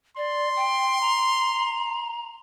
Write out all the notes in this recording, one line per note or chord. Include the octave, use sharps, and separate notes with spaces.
D5 C6
G5
A#5